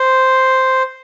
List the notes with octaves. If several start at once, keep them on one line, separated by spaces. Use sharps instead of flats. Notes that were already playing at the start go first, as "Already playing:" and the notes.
Already playing: C5